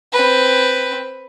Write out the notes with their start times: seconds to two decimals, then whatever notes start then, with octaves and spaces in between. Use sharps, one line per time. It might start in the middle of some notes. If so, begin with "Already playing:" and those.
0.13 C4 B4